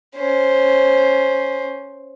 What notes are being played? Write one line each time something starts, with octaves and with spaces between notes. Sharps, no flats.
C#4 C5